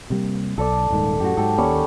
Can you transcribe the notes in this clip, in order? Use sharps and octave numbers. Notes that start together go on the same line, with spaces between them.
C3 G3 A#3
B1 A4 D5 D6
D#1 G#2 D#3
F#2 A2 F#4 G4
G#2 F#3 A4 G5
D#2 G3 A#3 C#4 C#6